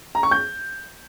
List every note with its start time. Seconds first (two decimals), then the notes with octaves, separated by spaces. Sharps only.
0.15 A#5
0.23 C#6
0.31 G6